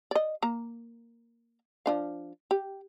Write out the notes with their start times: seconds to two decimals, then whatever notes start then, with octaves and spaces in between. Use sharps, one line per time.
0.11 D5 D#5
0.42 A#3 A#5
1.86 F3 D4 F5
2.51 G4